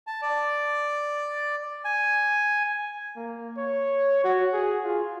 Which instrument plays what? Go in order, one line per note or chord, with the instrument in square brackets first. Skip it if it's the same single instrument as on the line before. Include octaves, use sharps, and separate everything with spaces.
[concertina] A5
D5
G#5
[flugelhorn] A#3
C#5
F#4
G#4
F4